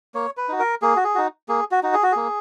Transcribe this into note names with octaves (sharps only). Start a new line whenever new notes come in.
A#3 C#5
B4
D#4 F#4
A#4
A#3 G#4
F#4
G#4
D#4 F#4
A#3 G#4
F#4
D#4 F#4
G#4
F#4
A#3 G#4